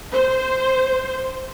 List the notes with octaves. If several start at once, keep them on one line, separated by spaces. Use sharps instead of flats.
C5